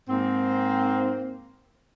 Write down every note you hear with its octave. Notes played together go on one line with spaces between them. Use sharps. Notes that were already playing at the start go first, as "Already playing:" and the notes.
G#2 A#3 C4